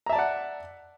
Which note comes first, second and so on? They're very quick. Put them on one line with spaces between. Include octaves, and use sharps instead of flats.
A#5 E5 A5 D5 F#5